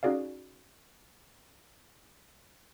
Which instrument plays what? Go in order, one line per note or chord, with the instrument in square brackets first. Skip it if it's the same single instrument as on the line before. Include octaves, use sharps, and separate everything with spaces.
[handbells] C#4 D#4 F#4 G#4 D5 F5